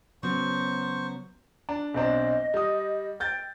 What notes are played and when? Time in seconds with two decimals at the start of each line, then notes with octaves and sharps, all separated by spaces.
0.23 C#3 F#3 B3 C5 C#6
1.69 D4
1.94 B1 C4 D4 D#5
2.54 G3 D#6
3.20 G5 G6 A6